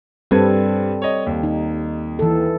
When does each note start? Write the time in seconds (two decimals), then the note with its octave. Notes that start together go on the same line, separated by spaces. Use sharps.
0.31 G2 G3 C4 A4 B4 G#6
1.02 C#5 D#5
1.26 D#2
1.43 D#4
2.19 E3 A4